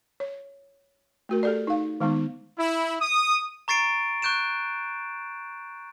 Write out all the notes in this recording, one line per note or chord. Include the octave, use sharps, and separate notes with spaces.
C#5
A3 F#4 A#4
G4 A4 D5
D#4 F5
D#3 G#3 B3 D#4
E4
D#6
A#5 C#6 A6 C7 D7
C#6 F#6 G6 D7 E7